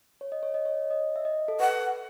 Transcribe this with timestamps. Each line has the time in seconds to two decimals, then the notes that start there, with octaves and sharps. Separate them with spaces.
0.21 C#5
0.32 D#5
0.43 C#5
0.54 D#5
0.65 C#5
0.90 D#5
1.16 E5
1.25 D#5
1.48 A4
1.60 B4 F#5